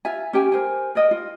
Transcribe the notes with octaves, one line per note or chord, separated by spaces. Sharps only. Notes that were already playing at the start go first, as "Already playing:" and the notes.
F4 E5 G#5
C#4 G4 G5 G#5
A#4 C5 G#5
A#4 D5 D#5 G5
F4